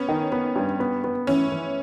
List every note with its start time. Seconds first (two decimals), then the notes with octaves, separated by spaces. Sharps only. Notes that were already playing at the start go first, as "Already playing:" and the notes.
Already playing: B3 C#4
0.09 D#3
0.32 B3
0.56 G2
0.80 B3
1.04 B3
1.27 E3 C#4
1.52 E3